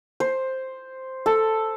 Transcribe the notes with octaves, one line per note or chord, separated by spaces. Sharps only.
C5
A4